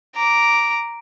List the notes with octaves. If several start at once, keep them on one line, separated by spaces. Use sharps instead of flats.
A#5 D6